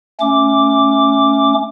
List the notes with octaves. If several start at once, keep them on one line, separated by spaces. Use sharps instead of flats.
A3 C#4 D6